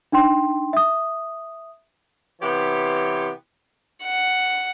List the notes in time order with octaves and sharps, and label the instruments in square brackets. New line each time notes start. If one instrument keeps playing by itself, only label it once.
[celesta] D4 D#4 G5 C6
E5 D#6
[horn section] C3 E3 B3 G4 C#5 C6
[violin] F#5